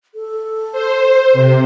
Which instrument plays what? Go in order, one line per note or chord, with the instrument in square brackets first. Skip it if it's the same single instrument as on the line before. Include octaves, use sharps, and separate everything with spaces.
[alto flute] A4
[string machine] C5
C3